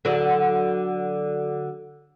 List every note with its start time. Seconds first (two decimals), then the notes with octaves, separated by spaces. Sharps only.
0.05 D3 F#3 D5